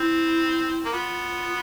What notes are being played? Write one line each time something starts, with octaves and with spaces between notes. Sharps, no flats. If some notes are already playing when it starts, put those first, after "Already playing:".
Already playing: C4 E4
A#3
B3 F4